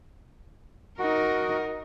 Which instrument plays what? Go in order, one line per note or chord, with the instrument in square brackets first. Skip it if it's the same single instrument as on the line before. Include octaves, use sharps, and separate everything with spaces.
[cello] D#4 A#4 [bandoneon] F#4